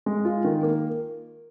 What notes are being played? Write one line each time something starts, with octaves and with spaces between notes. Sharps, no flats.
G#3
F4
D#3
A#3